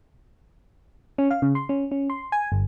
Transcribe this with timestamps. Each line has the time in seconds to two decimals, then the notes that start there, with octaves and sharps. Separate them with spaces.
1.18 C#4
1.31 F5
1.42 C#3
1.55 C6
1.69 C#4
1.91 C#4
2.10 C6
2.32 G#5
2.52 G1